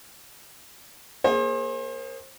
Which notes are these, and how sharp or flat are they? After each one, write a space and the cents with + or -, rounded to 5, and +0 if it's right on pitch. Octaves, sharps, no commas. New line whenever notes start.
A#3 +15 G#4 +0 C5 +35